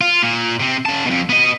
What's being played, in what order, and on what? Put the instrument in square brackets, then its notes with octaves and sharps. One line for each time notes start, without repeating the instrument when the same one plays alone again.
[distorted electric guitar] F4
A#2
C3 C4
C#3 A5
F2 B2
B3 D#5